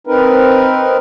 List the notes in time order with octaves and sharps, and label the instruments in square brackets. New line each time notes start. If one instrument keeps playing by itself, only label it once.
[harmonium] C4 D#4 A#4 B4